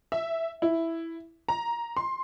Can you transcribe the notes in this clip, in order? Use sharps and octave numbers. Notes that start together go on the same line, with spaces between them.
E5
E4
A#5
C6